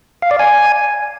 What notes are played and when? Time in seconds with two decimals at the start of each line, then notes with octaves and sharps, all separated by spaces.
0.22 F5
0.31 D5
0.39 G#5